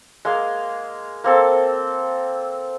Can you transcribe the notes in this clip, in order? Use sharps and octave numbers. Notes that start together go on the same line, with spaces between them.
G#3 A#3 F5
A#3 C4 A4